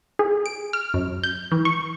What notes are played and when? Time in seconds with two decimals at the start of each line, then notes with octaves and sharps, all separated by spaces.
0.19 G#4
0.46 D7
0.73 F6
0.94 F#2
1.24 G6
1.52 E3
1.65 C#6